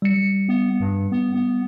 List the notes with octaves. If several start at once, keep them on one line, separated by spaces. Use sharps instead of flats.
G3 C#7
B3
G2
B3
B3